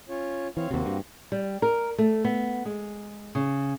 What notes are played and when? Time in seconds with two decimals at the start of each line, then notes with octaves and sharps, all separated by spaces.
0.09 C#4 F4 C#5
0.57 E3 C4 C#5 F5
0.71 D#2 C3 A#3 C4 F#4
0.86 G2
1.32 G3
1.62 A#4
1.98 A3
2.24 B3
2.65 G#3
3.35 C#3